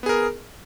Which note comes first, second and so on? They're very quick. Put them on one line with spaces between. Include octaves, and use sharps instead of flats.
B3 G#4 A#4